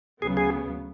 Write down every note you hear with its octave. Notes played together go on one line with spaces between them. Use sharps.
D2 C#3 F#3 B3 G#4
G#4